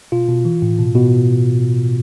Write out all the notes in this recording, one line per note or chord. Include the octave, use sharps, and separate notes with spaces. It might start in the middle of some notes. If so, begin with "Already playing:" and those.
B2 F4
B2
E3
A2
B2
B2